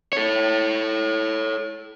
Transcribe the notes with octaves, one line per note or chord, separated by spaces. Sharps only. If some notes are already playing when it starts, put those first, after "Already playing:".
A4 C#5